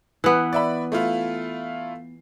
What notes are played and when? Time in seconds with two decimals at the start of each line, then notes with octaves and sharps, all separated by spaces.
0.24 E3 B3
0.53 D5 E5 B5
0.92 A3 E4 F4